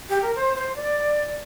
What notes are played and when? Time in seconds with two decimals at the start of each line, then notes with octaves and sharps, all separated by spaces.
0.09 G4
0.22 A#4
0.35 C5
0.55 C5
0.75 D5